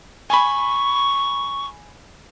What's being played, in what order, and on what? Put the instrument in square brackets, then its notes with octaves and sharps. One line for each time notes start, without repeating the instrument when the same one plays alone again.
[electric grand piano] G#5 B5 [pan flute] C#6